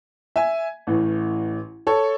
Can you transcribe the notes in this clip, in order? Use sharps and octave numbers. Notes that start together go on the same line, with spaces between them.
E5 G#5
A1 A2 E3
A4 C#5